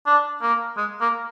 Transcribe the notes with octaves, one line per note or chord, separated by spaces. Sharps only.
D4
A#3
G#3
A#3